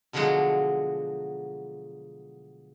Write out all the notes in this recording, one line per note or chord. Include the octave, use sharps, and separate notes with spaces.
B2 D3 F3 F#3 G#3 F#4